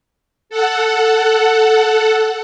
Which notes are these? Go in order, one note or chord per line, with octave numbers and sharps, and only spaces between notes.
A4 F#5